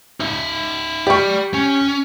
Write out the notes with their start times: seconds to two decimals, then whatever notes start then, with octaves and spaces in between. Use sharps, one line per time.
0.20 D#4 E5
1.07 G4 D5 B5 C#6
1.54 C#4